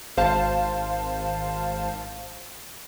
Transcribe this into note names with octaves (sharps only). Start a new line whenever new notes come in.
G#1 C5 F5 A5